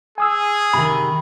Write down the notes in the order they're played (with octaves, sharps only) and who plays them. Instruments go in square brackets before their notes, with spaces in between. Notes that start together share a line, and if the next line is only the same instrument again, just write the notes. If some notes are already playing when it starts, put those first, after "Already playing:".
[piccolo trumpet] G#4 [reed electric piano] G#5 D#6 E6
[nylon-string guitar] C3 D#3 [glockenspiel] B5